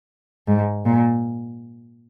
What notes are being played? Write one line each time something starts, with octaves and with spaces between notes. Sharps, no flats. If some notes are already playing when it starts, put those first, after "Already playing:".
G#2
A#2